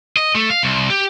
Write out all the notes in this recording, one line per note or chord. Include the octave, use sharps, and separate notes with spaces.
D#5
A3
F5
C2
G4